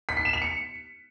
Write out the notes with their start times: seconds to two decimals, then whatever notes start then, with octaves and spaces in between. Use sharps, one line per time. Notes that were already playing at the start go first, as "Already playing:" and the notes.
0.09 B6
0.17 C7
0.25 E7
0.33 F7
0.42 C#7